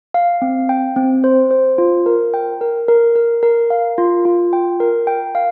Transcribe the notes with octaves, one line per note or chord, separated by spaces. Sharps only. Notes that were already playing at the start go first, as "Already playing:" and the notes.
F5
C4
G5
C4
C5
C5
F4
A#4
G5
A#4
A#4
A#4
A#4
F5
F4
F4
G5
A#4
G5
F5